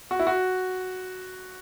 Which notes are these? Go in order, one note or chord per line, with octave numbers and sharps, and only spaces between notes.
F#4
E4
F#4